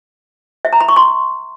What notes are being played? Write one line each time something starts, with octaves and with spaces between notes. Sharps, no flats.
E5
A#5
B5
C#6
C6